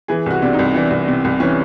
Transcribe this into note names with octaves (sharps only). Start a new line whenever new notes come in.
E3 G#4
C2 F#4
C3 D4
D#4
C2
E3 D4
C2
C3
C2
E3 C#4